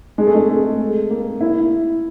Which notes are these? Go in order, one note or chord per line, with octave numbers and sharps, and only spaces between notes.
G#3
A3
G#3
A3
A#3
E4